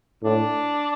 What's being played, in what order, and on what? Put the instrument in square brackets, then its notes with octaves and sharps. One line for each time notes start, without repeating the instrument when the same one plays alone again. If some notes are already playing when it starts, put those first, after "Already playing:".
[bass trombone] A2 [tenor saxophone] D4